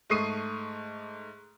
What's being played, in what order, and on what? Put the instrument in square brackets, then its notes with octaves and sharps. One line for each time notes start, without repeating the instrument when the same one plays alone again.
[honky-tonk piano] G#2 A3 C#6 D#6 C7 D#7